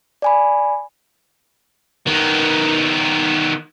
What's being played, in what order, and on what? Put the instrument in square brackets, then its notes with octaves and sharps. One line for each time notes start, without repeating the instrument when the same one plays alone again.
[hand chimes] D5 G#5 B5
[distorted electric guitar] D#3 B3